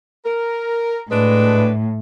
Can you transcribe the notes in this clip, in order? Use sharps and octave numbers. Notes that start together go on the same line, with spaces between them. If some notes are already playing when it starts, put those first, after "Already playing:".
A#4
A2 G#3 D4 B4